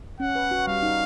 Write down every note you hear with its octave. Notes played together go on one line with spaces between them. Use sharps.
C#4 F#5
B4
F#4
G3 F5
D#4